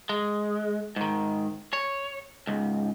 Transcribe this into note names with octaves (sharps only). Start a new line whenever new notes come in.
G#3
G#2 D#3
C#5
C#2 G#2